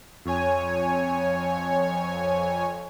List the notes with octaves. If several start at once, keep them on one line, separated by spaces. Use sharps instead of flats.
F2 C#5 G#5